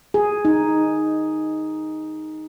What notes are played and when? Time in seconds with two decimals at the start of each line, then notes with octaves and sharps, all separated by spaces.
0.14 G#4
0.45 D#4